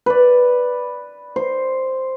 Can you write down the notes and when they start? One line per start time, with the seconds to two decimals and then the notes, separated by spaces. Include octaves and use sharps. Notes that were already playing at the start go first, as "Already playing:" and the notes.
0.06 B4 D5
1.36 C5